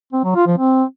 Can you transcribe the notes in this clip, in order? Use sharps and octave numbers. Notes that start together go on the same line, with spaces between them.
C4
F#3
F4
F3
C4